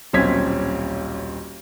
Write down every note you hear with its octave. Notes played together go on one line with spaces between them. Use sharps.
D#1 B1 C4 C#4 G#6 B6